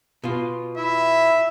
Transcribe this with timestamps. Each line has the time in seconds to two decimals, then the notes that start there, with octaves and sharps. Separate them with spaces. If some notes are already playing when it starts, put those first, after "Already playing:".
0.24 B2 F4
0.78 E4 E5